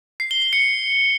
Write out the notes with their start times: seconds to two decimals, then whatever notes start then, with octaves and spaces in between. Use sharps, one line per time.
0.20 C7
0.31 G7
0.42 G7
0.53 C#7